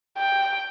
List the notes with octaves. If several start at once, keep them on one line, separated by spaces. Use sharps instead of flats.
G5